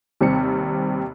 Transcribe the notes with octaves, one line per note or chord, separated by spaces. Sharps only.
D#2 C3 G3 C4 C#7